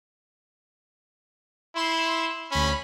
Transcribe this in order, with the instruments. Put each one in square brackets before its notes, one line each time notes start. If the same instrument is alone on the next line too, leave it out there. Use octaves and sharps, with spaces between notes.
[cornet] E4 [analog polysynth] C6 E7
[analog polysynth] D2 B5 [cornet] C#4